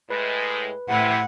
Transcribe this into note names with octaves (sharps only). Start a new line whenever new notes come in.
A2 G#3 B4
A2 C3 E4 F#5